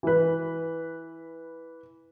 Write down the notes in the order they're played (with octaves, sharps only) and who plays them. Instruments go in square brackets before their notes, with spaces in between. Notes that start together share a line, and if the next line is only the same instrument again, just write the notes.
[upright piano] E3 B4